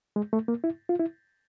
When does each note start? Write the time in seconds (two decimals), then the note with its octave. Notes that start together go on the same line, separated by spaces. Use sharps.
0.16 G#3
0.33 A3
0.48 A#3
0.64 E4
0.89 F4
1.00 E4